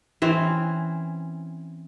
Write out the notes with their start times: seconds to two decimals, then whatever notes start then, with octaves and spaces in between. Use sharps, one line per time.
0.22 E3 C4 C#4